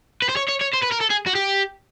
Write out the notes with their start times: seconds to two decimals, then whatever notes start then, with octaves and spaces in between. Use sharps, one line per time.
0.22 B4
0.29 C5
0.37 C#5
0.49 C#5
0.61 C#5
0.74 C5
0.83 B4
0.92 A#4
1.01 A4
1.11 G#4
1.27 F#4
1.35 G4